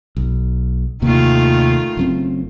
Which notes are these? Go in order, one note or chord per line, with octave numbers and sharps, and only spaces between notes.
B1
D#2 C3 D#3 A3 A#3 F4
F#1 F#2 C4